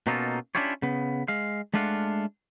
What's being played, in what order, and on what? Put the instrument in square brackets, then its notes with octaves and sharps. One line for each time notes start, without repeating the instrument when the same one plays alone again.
[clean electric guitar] B2 A#3 C#4 D#4 F4 A4
C#4 D4 E4 F4 G4 C#5
C#3 B3
G#3 F5
G#3 A3 D4 F4 F5 F#5